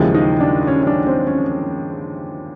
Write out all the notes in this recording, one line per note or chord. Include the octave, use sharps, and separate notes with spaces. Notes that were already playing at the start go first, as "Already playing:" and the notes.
Already playing: D#2 C#3 F3 G#3 E4
D#4
D4
C#4
C#4
D4
C4
C#4